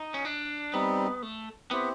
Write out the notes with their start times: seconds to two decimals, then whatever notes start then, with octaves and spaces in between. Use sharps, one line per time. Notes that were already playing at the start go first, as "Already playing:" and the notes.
Already playing: D#4
0.14 C#4
0.25 D4
0.73 G3 B3 C4 D#4
1.22 A3
1.71 B3 C4 E4 G4 C5